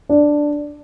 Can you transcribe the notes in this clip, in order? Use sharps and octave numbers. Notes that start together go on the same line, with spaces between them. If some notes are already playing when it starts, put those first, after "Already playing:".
D4